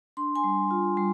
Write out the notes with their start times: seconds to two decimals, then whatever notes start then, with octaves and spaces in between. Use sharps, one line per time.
0.17 D4 C6
0.35 G#5 C6
0.44 G3
0.71 F4
0.97 G3